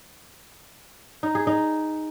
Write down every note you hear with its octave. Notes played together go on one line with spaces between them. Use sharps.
D#4
G#4
D#4